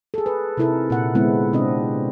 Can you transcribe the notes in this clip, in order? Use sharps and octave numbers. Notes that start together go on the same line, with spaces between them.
G#4 A4
B4
C3 D#4 E4 A4 A#4
A#2 F#5
D3 G#3 B3 C4 E4
C3 C4 D4 D#5